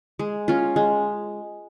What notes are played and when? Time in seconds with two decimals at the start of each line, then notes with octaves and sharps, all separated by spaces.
0.19 G#3
0.48 C#4 F4
0.76 G#3